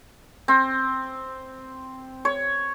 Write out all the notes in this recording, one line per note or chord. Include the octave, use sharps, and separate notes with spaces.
C4
C#5